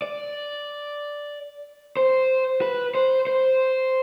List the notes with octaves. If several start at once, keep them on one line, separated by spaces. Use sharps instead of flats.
D5
C5
B4
C5
C5